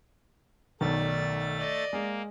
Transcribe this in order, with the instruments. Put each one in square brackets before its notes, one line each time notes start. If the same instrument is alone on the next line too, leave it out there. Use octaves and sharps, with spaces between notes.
[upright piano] B1 D#3 [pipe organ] A3 A6 [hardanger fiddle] D5
[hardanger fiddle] D5 D#5
[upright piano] G#3 [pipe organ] A#3